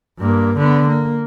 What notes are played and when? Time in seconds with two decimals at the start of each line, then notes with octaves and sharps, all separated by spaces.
0.19 G2 A#3
0.57 D3 B3
0.88 A#3